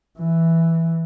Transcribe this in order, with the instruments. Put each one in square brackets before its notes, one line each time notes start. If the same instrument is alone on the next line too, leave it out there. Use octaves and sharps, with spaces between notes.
[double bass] E3